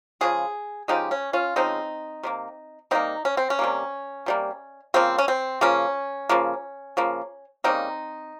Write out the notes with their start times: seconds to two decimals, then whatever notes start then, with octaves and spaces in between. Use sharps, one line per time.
0.21 C#3 F3 G#3 G#4
0.88 C#3 F3 G#3 D#4 G4
1.11 C#4
1.33 C#4 F4
1.56 C#3 F3 G#3 C4 D#4
2.23 C3 G3 A#3
2.91 C3 G3 A#3 C4 D#4
3.25 C#4
3.37 C4
3.50 C#4
3.59 C3 G3 A#3
4.26 C3 G3 A#3
4.94 C#3 F3 A#3 C4
5.18 C#4
5.28 C4
5.61 C#3 F3 A#3 C#4
6.29 C#3 F3 A#3
6.97 C#3 F3 A#3
7.64 C#3 G3 A#3 C4 D#4